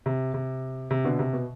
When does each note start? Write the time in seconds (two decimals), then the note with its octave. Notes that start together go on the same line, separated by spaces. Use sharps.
0.06 C3
0.34 C3
0.91 C3
1.04 B2 D3
1.19 C3
1.33 B2